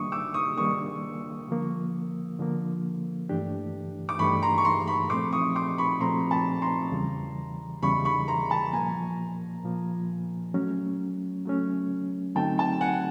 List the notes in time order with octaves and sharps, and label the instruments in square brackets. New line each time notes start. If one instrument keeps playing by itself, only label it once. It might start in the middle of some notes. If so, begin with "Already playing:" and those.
Already playing: [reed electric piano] D#3 G3 A#3 D4 [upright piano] C#6 D#6
[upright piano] D6 E6
C#6 D#6
[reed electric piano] D#3 G3 A#3 D4 [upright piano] C#6 D#6
[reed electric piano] D3 F3 A#3
D3 F3 A#3
G2 E3 A3 D4 G4
[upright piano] D6
[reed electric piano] G2 E3 A3 D4 G4 [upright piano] B5 C#6
[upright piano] A#5 C6
C#6
A#5 C6
B5 C#6
[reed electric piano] A#2 F3 A3 C4 [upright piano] C6 D6
[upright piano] C#6 D#6
C6 D6
B5 C#6
[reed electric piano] A#2 F3 A3 C4 [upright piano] A#5 C6
[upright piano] A5 B5
A#5 C6
[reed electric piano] E2 C#3 E3 G3
[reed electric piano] E2 C#3 E3 G3 [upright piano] B5 C#6
[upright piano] B5 C#6
A#5 C6
A5 B5
[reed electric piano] A#2 F3 A#3 [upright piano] G#5 A#5
[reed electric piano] A#2 F3 A#3
F#3 A3 C#4
F#3 A3 C#4
[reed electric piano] D3 F#3 A3 C4 D#4 [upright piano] G5 A5
[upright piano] G5 A5
F#5 G#5